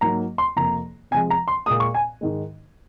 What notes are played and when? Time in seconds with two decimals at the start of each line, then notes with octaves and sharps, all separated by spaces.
0.01 G#2 F#3 A#3 A#5
0.38 C6
0.56 F2 C3 F3 A#3 A#5
1.11 C3 F3 G#3 G#5
1.30 A#5
1.48 C6
1.66 A#2 G#3 D#6
1.80 C#6
1.95 G#5
2.21 G#2 D#3 G#3